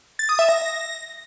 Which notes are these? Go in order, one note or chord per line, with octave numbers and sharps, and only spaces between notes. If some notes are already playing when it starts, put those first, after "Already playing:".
A6
D#6
E5
A#6